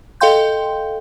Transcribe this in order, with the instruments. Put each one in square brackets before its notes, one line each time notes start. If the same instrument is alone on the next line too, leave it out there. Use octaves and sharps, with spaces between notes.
[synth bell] A4 D#5 F5 G5 C6 G6